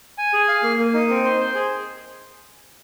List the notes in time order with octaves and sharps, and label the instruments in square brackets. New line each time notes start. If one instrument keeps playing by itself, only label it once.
[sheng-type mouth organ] G#5
G#4
F5
A#3
A#3
D#4
C4
C5
C5
G#4